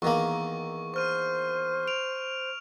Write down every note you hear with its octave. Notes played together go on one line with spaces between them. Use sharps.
E2 D#3 A#3 C#6
C5 C#6 F6 D#7
D7 F7